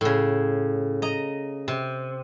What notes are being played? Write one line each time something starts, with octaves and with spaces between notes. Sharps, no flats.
A2 C#3
D#5 A#5
C3